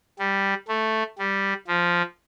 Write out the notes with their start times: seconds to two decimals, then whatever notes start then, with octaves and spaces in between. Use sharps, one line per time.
0.19 G3
0.68 A3
1.18 G3
1.67 F3